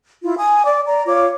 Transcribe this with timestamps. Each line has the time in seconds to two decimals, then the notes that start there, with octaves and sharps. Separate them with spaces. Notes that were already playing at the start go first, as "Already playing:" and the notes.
0.23 E4 F4
0.37 G#5 D#6
0.65 D5 D6
0.87 D5 A#5
1.06 F4 C#5 D6